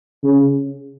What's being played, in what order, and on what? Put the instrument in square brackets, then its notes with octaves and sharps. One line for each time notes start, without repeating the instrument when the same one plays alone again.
[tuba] C#3